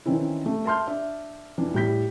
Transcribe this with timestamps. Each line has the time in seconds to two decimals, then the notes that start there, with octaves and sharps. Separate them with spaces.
0.06 D#3 E3 C4 C#4 E4
0.46 A3
0.65 E5 A5 C6 F6 G6
0.87 D4 E5
1.58 F2 E3 D4
1.74 A2 G3 G6 B6